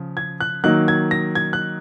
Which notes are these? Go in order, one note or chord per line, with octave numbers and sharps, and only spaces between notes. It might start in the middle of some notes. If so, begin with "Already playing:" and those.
Already playing: C#3 F3
G#6
F#6
D#3 F#3 A#3 D#4 F#6
G#6
A#6
G#6
F#6